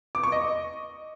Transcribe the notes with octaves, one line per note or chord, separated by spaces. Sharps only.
D6
C#6
D#5